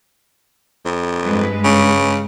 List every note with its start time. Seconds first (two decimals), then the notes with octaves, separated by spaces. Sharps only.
0.86 F2
1.23 G2 G#3 B4
1.64 C#3